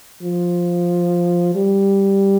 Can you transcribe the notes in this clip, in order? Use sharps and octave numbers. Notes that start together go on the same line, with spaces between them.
F3
G3